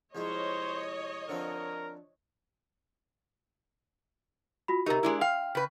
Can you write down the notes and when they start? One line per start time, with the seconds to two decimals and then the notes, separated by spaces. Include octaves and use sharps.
0.15 C2 F3 G#3 C5 C#5 D#5
1.29 D3 F3 C4 A#4
4.68 F4 F#4 B5
4.86 C3 D#4 G4 A#4 A#5
5.03 G#3 D4 E4
5.21 F5 G5 F6
5.55 C#3 B4